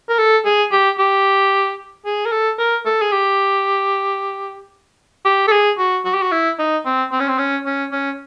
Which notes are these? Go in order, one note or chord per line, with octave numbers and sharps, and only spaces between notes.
A#4
A4
G#4
G4
G4
G#4
A#4
A4
A#4
A4
G#4
G4
G4
A4
G#4
F#4
F#4
G4
F#4
E4
D#4
C4
C4
C#4
C4
C#4
C#4
C#4